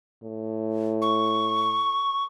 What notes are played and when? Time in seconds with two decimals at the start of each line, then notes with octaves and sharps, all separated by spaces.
0.23 A2
1.02 C#6